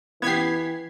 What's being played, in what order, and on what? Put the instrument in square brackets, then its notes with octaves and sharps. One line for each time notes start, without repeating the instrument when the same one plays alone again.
[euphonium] E3 [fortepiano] B3 G4 [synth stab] G#6 B6 C7